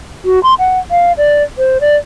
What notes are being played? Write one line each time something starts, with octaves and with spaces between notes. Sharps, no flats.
F#4
C6
F#5
F5
D5
C5
D5